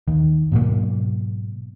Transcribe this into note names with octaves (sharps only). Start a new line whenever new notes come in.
D#2 D#3
G#2 B2 F#3 A#3